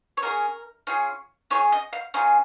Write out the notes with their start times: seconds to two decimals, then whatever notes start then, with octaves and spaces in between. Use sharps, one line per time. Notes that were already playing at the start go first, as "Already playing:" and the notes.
0.17 C#5
0.22 C#4 F4 G#4 A#4
0.87 C#4 F4 G#4
1.50 C#4 F4 G#4 C#5
1.72 D#5
1.93 F5
2.14 C#4 F4 G#4 A#5